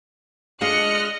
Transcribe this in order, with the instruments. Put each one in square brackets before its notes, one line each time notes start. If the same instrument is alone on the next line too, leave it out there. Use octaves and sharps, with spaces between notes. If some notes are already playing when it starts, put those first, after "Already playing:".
[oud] G#3 D4 F4 [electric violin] D#5 [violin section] F6 F#6 C#7